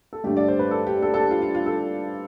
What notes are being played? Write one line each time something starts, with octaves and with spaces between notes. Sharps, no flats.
A4
G2 D3 A3 G4
D5
C5
B4
A4
G4
A4
A4
G4
F4
F4
F4
A4